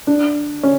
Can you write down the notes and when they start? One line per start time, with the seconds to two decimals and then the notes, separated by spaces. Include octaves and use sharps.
0.07 D4
0.63 C#4